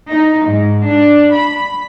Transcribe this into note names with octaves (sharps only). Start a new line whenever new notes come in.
D#4
G#2
D4
B5